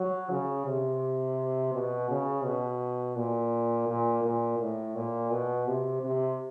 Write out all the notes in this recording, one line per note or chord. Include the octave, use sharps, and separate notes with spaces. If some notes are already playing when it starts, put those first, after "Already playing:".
Already playing: F#3
C#3
C3
B2
C#3
B2
A#2
A#2
A#2
A2
A#2
B2
C3
C3